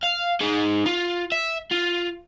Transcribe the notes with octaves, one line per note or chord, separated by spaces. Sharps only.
F5
D#4 G#4
F4
E5
F4